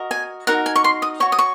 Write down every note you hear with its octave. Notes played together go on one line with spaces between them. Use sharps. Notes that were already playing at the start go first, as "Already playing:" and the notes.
Already playing: F#4 A#4 D#5
G#5
D#4 F#4 A#4 F#5
G#5
C#6
C6
D#6
F#4 C#5 C#6
D#6
C#6